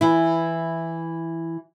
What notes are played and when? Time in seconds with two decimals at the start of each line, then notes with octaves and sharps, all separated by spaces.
0.01 E3 E4